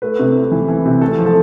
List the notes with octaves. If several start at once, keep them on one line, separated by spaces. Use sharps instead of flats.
A3 B4
C3
E4
E3
E3
C3
A3 A4
F3
A4